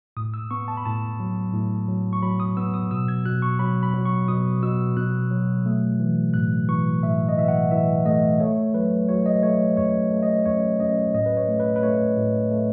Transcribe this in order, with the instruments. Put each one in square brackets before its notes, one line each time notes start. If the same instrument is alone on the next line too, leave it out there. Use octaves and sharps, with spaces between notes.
[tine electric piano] A2 D#6
E6
B3 C#6
A5
B5
A2 A5
F#3
A2
F#3
C#6
F#3 B5
D#6
B3 E6
D#6
B2 E6
G#6
B2 F#6
C#6
F#3 B5
B5
F#3
C#6
B2 D#6
B2 E6
B2 F#6
F#3
A3
E3
A2 F#6
E3 C#6
A2 E5
D#5
E3 E5
F#5
E3 E5
A3 D#5
A3 C#5
F#3 B4
F#3 C#5
D#5
A3 C#5
F#2 C#5
A3
D#5
F#2 C#5
F#2 D#5
A2 D#5
B4
C#5
A3
B4
B4
A3 C#5
A2
A3